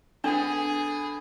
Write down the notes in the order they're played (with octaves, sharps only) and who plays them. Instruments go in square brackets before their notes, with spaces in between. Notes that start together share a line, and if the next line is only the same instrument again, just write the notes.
[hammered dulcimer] D3 B3 [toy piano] D4 [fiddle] G#4